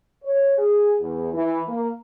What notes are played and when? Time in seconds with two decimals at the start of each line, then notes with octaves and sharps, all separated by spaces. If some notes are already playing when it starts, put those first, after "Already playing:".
0.23 C#5
0.58 G#4
1.01 E2
1.33 E3
1.67 A#3